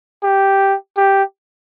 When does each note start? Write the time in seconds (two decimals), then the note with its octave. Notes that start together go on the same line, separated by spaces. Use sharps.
0.23 G4
0.97 G4